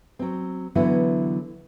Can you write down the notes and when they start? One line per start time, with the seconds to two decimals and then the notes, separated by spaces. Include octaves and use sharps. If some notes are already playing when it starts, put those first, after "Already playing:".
0.19 F#3 C4
0.75 D3 E3 F#3 B3 E4